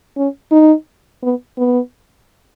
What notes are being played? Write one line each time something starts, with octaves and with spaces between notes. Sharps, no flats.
C#4
D#4
B3
B3